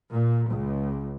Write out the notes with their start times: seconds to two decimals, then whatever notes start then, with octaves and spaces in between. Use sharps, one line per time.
0.12 A#2
0.49 C#2